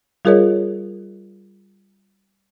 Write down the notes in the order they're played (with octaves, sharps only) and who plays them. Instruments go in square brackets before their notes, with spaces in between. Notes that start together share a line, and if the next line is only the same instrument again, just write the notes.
[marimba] G3 F4 G#4 A#4 C#5 D#5